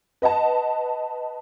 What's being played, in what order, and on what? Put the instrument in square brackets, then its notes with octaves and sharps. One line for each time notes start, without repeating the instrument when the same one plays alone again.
[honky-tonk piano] B4 D#5 F#5 A5